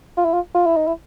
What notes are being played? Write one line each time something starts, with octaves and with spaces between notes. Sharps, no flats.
F4
E4
F4
F4
E4
D#4
E4